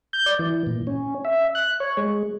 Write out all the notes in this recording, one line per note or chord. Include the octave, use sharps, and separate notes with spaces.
G6
D5
E3
A#2
C#4
E5
F#6
C#5
G#3